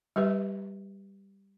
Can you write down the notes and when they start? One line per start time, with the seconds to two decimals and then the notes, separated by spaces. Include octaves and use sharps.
0.16 G3 G4 B4 E5